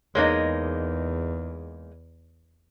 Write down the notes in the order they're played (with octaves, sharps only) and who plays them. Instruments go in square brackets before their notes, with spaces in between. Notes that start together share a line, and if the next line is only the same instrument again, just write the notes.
[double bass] E2 [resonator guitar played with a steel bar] G#3 A#3 D#4 [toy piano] C#5 D#5